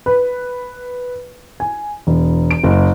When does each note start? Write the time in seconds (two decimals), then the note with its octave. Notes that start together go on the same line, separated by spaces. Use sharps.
0.06 B4
1.60 G#5
2.07 E1
2.51 D7
2.64 F#1